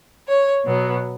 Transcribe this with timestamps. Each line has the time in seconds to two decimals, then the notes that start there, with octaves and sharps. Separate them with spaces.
0.28 C#5
0.65 B2 F#3 B3